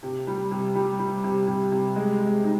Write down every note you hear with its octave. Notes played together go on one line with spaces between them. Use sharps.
C3
G3
C3
G3
G3
C3
C3
C3
G#3
G#3
D#4